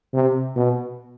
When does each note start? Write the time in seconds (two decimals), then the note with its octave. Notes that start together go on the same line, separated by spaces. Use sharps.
0.14 C3
0.56 B2